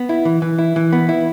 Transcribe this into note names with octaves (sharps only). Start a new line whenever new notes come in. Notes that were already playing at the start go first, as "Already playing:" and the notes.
Already playing: B3
E4
E3
E3
E4
E3
B3
E4